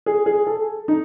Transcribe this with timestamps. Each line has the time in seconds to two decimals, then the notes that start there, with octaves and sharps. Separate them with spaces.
0.06 G#4
0.26 G#4
0.47 A4
0.88 D#4